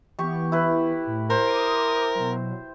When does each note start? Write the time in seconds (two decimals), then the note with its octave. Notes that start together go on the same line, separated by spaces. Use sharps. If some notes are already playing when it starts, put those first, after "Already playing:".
0.19 E3 B3 G4 C#6
0.52 E4 B4
1.06 A2
1.30 A#4 C5
1.45 D6 D#6
2.15 B2 F#3